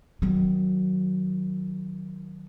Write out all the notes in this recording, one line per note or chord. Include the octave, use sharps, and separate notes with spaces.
D#3 F#3